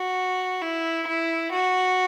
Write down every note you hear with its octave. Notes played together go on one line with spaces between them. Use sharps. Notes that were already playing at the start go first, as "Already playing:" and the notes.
Already playing: F#4
E4
E4
F#4